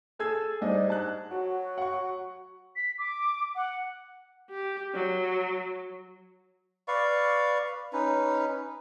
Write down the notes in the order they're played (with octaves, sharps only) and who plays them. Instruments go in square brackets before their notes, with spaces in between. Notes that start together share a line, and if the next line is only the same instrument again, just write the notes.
[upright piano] G#4 E6 G#6 [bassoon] A4
[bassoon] G#2 [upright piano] G3 D4 D#5
[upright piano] A5 F#6
[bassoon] F#3 [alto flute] F#4
[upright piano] F#5 C#6
[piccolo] B6
D6
F#5
[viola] G4
F#3
[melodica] B4 D5 F5 C#6
C#4 D#4 B4